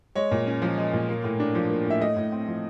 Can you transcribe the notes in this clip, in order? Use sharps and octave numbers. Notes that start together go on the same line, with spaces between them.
G#3 C#5
A#2
C#4
F3
G#3
A#2
A#3
A2
D4
F3
A#3
A2 E5
A3 D#5
A2
C4
F3